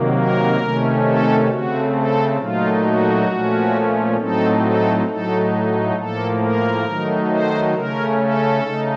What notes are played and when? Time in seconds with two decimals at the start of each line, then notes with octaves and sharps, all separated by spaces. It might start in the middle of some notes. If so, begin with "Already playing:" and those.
Already playing: C3 D#3 F#3 A#3
0.15 A#4
0.60 C3 D#3 A3 C#4
1.05 A4
1.49 C#3 A3 C4 F#4
1.94 A4
2.39 A#2 F#3 A3 D#4 F4
2.83 F#4
3.28 A#2 F3 A3 C#4
4.16 A2 F#3 A3 C4 D#4 A4
4.61 A4
5.06 A2 F#3 A3 D#4 A4
5.96 A2 F3 A#3 A4
6.41 A#4
6.85 D#3 F#3 A3 D#4
7.29 C5
7.74 C#3 A3 C#4 A#4
8.18 A4
8.63 C#3 A3 D#4